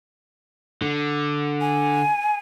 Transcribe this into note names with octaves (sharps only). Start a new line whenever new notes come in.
D3
G#5